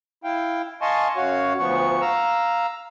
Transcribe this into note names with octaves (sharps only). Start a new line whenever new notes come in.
E4 F5 G5
D#5 F5 G#5 A5 C6 C#6
F#2 F#4 C#5 F5
D2 F3 B3 C#6
F5 A#5 E6